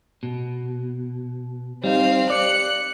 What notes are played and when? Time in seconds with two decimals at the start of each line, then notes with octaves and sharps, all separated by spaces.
0.23 B2
1.84 G3 C4 D#4 F5
2.30 D5 F#6 C#7